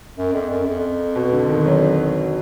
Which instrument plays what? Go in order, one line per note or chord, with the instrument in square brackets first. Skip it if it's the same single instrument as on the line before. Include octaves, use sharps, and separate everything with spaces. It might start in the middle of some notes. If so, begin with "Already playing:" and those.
[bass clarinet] F#2
F2
F#2
F2
[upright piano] B2
D3
D#3
F#3